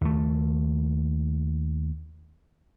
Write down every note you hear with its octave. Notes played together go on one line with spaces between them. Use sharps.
D#2 A3